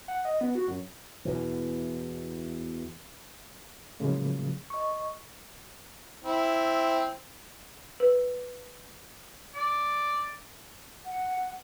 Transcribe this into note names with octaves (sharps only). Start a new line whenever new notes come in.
F#5
D#5
B3
F#4
F#2
E2 B2 E3
A2 C#3 F3 F#3 G#3 A#3
D#5 C#6
C4 E4
B4
D5
F#5